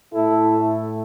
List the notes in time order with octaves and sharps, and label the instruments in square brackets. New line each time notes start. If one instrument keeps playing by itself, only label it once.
[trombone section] A2 A3 E4 A4